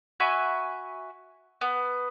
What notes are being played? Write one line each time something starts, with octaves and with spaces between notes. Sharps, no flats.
F#4 E5 G#5 B5
B3